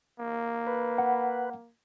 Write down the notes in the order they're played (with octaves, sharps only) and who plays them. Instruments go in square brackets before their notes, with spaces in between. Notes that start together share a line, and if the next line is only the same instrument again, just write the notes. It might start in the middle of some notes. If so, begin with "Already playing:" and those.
[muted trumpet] A#3
[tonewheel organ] B4
[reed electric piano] F#5